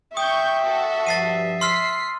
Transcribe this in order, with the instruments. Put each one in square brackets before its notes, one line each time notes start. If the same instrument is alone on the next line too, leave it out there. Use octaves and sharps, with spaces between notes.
[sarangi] E5 [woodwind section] G5 [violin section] C#6 G6 [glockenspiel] D#6
[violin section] F#4 A4
[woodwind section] G2 F3 [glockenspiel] A6 C7 D#7
[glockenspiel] C6 E6 F6 [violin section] B6 C7